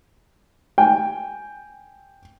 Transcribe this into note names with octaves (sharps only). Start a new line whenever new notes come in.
G5 G#5